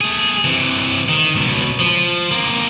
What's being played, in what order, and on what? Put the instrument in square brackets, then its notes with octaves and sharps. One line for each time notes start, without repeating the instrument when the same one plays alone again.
[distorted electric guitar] A3 G#4
C3 E3
D#3
C#2 B2
F3
A#3 C4